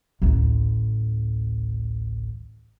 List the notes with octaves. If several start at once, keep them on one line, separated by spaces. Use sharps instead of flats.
A1 D2